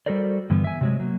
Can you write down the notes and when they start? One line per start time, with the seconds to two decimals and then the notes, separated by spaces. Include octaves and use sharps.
0.06 G3 F#4 A4 A#4 C5 D5
0.50 G2 D3 E3 G3 B3
0.64 E5 G#5
0.81 C3 F#3 G#3
1.00 F#3 A#3